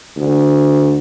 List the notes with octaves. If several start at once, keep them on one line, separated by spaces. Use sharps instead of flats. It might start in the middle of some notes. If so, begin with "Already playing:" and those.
D2